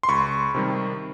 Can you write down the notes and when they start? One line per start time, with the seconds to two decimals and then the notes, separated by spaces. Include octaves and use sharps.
0.03 C6
0.09 C#2 B5 C#6
0.55 C3 D#3 G3